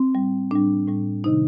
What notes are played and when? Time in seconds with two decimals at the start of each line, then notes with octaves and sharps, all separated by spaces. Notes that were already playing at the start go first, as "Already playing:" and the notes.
Already playing: C4
0.15 A2 G3
0.51 A2 G3 D4
0.88 A2 G3
1.24 C3 D#3 D#4